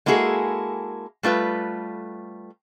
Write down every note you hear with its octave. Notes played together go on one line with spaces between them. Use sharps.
G#3 A#3 E4 F#4 G#4 A4
G3 A3 F4 B4